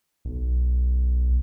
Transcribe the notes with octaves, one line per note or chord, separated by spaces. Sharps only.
B1